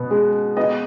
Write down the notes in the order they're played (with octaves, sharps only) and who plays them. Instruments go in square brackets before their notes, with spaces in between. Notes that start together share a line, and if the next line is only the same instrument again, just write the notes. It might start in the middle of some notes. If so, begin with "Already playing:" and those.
Already playing: [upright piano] B2 B3
G#3
B3 D#5